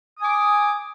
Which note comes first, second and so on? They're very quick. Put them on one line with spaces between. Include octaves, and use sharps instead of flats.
D#6 G#5 D6